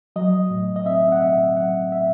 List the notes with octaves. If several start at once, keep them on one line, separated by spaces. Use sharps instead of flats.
F#3 D#5
A2
D#5
C4 E5
F#5
A2 E5
F#3 F#5
A2 E5